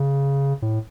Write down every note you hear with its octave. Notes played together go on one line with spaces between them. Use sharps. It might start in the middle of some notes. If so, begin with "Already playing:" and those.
Already playing: C#3
A2